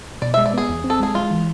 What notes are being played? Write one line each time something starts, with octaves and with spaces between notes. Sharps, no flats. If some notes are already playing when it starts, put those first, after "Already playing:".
B2 D5
G#3 E5
D5
B3 G#4
E2
C4
A4
G#3 G#4
G#3 F4
E3